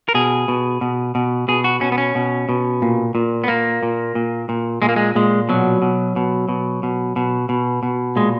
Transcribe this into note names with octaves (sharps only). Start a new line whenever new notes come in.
A#4
B2 G#4
B2
B2
B2
B2 G#4
F#4
B2 C#4
B3
C#4
B2
B2
A#2
A#2
B3
A#2 A#3
A#2
A#2
A#2
A#2 G#3
A#3
G#3
A#2 G#3
B2 F#3
B2
B2
B2
B2
B2
B2
B2
A#2 G#3